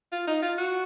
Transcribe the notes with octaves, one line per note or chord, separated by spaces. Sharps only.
F4
D#4
F4
F#4